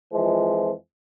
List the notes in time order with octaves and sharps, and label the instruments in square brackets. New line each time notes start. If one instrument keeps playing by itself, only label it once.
[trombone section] F2 E3 F3 G#3